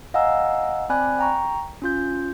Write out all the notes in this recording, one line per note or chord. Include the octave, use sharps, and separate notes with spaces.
D#5 F5 F#5 G#5 A#5 E6
C4 D5 G#5 B5 F#6
G5 A#5 C#6
C#4 F4 G6